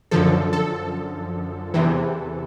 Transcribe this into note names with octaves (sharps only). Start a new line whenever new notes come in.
F#2 D3 F3 A4
A4
E2 C3 E3